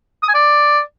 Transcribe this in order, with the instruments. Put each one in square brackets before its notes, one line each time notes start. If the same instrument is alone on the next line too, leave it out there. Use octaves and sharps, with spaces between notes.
[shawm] D#6
G#5
D5